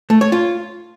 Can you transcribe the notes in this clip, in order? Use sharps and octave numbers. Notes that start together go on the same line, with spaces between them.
A3
C#5
F4